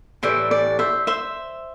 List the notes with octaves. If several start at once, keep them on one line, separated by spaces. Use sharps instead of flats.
A2 E3 G3 C5 E5
D5
C5 E5
C5 E5